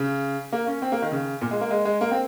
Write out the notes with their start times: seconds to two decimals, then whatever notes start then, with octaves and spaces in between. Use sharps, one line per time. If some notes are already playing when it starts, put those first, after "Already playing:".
Already playing: C#3
0.52 A#3
0.67 C#4
0.82 C4
0.92 A#3
1.02 D#3
1.12 C#3
1.41 A#2
1.51 G#3
1.61 A#3
1.71 G#3
1.85 G#3
2.01 A#3
2.11 C4